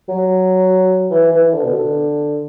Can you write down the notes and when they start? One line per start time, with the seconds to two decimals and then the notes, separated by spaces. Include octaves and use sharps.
0.09 F#3
1.10 E3
1.32 E3
1.54 D3
1.63 B2
1.73 D3